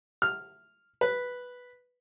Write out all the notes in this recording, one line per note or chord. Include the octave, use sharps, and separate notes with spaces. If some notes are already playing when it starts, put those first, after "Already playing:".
F6
B4